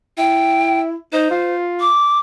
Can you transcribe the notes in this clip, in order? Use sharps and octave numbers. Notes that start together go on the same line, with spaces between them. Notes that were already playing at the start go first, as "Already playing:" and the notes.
E4 G5
D#4 C5
F4
D6